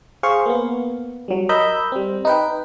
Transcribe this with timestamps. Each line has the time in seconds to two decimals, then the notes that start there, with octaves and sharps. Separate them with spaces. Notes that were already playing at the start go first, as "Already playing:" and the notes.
0.23 G#4 C5 F5 C#6
0.46 A#3 B3
1.28 F#3 G3
1.49 A#4 D#5 B5 E6 G6
1.92 G3 C4
2.25 D#4 B4 G5